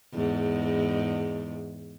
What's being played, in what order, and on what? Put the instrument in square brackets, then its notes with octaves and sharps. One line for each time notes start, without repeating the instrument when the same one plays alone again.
[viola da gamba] E2 G#2